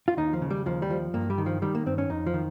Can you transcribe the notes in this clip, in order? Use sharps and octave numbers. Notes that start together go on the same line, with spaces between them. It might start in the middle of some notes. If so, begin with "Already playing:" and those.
F4
D#2 D#4
F3
C#3
G3
D#2 F3
G3
F3
G2 A#3
G3
D#3
F3
D#3 G3
A#3
G2 C4
C#4
F2 D#4
F3
D#3